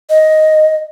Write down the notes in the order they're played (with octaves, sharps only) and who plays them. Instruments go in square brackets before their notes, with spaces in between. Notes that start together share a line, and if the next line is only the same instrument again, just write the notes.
[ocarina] D#5